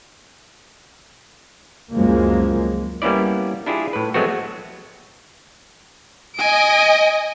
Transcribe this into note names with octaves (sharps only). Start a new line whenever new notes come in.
C#2 F#2 C#3 F3 G#3 A#3
G3 A#3 B3 C#4 E4 D5
D4 E4 F4 G4 G#4
A2 B4
F#3 G#3 A3 B3 C4 F#4
D#5 G#5 D7